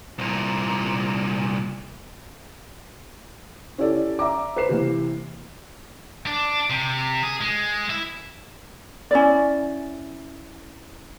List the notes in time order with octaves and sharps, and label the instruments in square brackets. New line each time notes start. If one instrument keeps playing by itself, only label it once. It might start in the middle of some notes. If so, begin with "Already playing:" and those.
[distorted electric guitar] C2 A#2
[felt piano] C#4 E4 G4 A4 D5
D5 E5 A#5 D6
B4 C5 C7 E7
C3 E3 A#3
[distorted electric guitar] D4
C3
G#4
G#3
E4
[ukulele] C#4 E4 D5